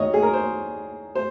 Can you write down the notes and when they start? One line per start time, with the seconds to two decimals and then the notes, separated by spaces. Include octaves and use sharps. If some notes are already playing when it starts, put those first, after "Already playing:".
Already playing: D#2 C#5 D#5
0.14 G#4
0.23 A#4
0.34 C5
1.15 C5